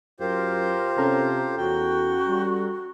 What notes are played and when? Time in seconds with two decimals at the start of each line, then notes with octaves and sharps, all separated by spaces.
0.20 F#2 F4 G4 A#4 C5
0.98 C3 C#4 A4 A#5
1.58 E2 F#4 G5
2.27 G3